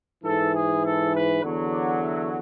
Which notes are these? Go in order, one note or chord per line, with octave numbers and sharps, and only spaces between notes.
G#2 E3 A4
G#4
A4
B4
E2 D3 F#3
D5
E5